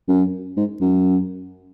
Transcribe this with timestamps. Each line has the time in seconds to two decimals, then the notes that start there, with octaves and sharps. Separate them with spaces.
0.08 F#2
0.57 G#2
0.81 F#2